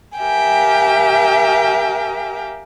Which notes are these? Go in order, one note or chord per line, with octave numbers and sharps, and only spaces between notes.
G4 A#4 E5 F5 G5 G#5